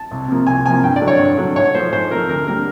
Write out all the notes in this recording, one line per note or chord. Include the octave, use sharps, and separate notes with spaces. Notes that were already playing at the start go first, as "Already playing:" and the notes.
Already playing: A5
C2
C3 F3 A#3
C2 G#5
C3 F3 A#3 G#5
G2 G5
D5
D3 F#3 A3
C#5
G2
D3 F#3 A3
G#2 C#5
F3 A3 C5
G#2 C5
F3 A3 A#4
D2 A#4
D3 G3 A#3 A#4